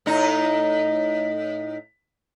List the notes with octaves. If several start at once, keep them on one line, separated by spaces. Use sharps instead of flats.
A2 D#4